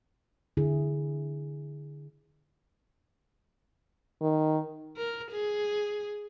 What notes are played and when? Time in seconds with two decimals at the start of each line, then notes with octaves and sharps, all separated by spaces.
0.57 D3 E4 G#4
4.21 D#3
4.97 A#4
5.31 G#4